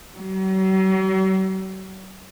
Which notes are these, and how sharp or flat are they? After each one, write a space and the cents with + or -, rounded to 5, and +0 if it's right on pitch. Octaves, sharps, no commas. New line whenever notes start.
F#3 +45